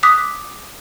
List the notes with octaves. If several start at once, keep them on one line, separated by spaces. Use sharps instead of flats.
D6 D#6 F#6 B6